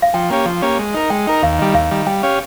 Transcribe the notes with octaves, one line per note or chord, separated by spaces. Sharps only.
F5
F3 G5
A#3 C#4 G4 C#5
F3
A#3 C#4 G4 C#5
G#3
D#4 A#4
G#3 G5
D#4 A#4
D#2 F5
D#3 G3
D#2 F5
D#3 G3
G3 G5
C#4 G4 C#5 F5